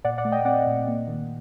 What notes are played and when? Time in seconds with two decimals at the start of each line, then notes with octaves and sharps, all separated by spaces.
0.04 A#2 D5 F#5
0.18 D5 F#5
0.25 A3
0.32 D#5 G5
0.45 C4 D5 F#5
0.67 A#2
0.88 A#3
1.08 D#3